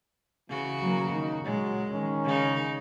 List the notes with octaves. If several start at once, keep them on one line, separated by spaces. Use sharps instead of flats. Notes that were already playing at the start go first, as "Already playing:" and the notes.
C#3 E3 F#4
F#3 A#3
D#3 D#4
A#2 F#3 G#3
D#3 C#4
C#3 D#4